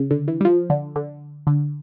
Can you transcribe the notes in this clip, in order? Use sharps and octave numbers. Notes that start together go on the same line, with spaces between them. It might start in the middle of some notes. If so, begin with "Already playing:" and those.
Already playing: C#3
D3
E3
G3
F3
D3
D3
D3